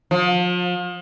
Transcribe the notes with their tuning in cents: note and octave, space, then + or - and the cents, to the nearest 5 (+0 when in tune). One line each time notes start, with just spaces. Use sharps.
F3 +35